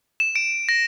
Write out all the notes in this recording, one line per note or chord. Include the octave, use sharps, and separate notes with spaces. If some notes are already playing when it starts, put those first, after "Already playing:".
E7
D7
A#6